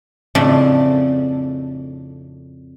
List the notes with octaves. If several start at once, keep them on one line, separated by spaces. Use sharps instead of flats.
F2 A2 C#3 D4